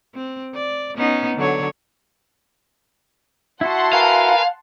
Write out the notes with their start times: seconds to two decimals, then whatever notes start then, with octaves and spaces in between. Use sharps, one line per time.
0.14 C4
0.54 D5
0.97 B3 C#4 D#4
1.37 D3 F#3 C#5
3.61 E4 F#4 F#5 A5 C6
3.93 A#4 B4 F5 G#5